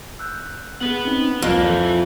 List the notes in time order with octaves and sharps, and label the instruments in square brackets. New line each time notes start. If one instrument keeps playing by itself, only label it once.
[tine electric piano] E6 F#6 G6
[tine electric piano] B3 G#4 [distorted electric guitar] B4 F#5
[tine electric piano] C4 C#4 D#4
[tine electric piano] C2 D5 [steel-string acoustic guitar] F2 [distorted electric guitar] A#3
[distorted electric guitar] E3 [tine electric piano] F4 A4 G6